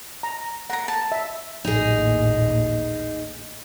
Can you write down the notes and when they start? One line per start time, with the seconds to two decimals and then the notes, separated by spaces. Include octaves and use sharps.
0.23 A#5
0.70 A#4 F#5 A#5
0.88 A5
1.12 E5
1.65 A1 D#2 A#2 D#4 G#4